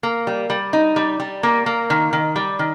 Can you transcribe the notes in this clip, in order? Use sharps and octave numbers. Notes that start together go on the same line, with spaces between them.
A#3
G3
G3
D#4
G3
G3
A#3
A#3
D#3
D#3
G3
D#3